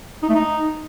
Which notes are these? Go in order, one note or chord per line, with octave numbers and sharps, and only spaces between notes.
D#4
A3
D#4